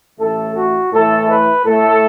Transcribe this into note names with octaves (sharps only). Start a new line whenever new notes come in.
A1 A2 A3 A4
F#4
A2 E3 A3 A4
B4
A2 A3 A4